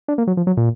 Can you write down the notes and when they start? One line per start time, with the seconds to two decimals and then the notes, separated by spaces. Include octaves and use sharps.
0.08 D4
0.18 A#3
0.27 F#3
0.37 F3
0.47 F#3
0.57 A#2